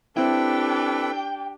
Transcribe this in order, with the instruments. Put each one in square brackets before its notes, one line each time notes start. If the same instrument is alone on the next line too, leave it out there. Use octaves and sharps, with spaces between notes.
[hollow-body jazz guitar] C4 E4 [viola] D4 G4 [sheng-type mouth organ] A4 B4 [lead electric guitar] G5